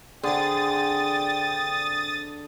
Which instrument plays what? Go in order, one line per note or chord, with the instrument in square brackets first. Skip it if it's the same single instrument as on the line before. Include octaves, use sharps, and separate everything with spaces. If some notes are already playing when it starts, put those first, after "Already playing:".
[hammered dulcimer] D3 [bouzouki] C4 G#4 [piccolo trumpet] G5 [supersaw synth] D#6 A6